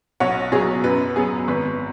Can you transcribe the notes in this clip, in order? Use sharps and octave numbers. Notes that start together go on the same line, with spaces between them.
B1 C#5 F#5
B2 F#3 G#4 C#5
F#2 B4
F#3 B3 G#4
G#1 B4